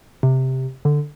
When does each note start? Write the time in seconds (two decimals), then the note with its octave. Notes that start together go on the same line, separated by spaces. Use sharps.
0.23 C3
0.85 D3